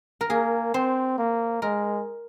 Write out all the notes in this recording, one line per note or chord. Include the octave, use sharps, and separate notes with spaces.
A#4
A#3 G#4
C4 C5
A#3
G#3 A#4